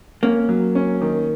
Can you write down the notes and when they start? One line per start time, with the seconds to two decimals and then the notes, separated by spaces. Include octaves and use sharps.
0.23 A#3 C#4
0.49 F#3
0.75 C#4
1.01 D#3